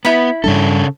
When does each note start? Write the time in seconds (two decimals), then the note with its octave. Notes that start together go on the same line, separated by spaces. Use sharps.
0.05 B3 E4 B5
0.44 G2 C#3 G3 D4 A4